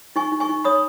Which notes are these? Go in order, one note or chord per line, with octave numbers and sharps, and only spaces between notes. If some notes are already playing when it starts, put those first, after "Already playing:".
D#4 G#5 C#6
D#4
G#5 C#6
D#4
C#5 B5 D#6